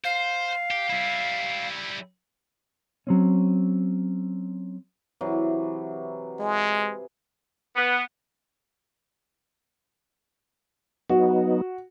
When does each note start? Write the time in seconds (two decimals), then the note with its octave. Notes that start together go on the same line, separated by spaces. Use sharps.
0.05 C5 F5
0.71 G4
0.90 G3 E4
3.07 F#3 C4 C#4
5.21 C3 E3 F#3
6.40 G#3 G#4
7.76 B3
11.10 F#3 B3 D#4 F#4